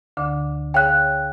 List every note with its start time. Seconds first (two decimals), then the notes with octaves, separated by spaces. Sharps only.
0.17 D2 D3 D6
0.74 G#4 C#5 F5 G5 F#6